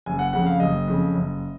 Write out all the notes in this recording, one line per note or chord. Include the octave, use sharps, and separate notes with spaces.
F#1 G#5
F#5
F2 C#3 F#5
F5
F#1 D#5
F2 C#3
F#1